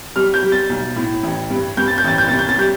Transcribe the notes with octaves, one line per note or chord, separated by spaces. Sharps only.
G3 F6
G6
G3
A6
B1
A2
A1
G2
G2 G6
A6
G6
A1 A6
G6
C2 A6
G6
A6
G3 G6